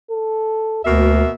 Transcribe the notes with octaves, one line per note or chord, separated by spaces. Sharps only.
A4
D2 B2 A#3 F#4 E5